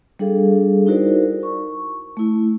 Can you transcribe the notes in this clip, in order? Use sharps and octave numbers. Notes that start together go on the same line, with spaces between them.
G3 D4 G#4 A4 F5
D#4 E4 F#4 A#4 C5 D5
C#6
A3 E4